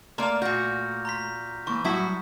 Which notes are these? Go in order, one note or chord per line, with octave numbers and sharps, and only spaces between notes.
A3 A#3 D5 C6 F6 F7
A#2 F#4 G6 A#6
A#5 C6 B6
E3 A#3 C6 C#6
A2 F#3 G3 E4 F#4 A5 D#6 B6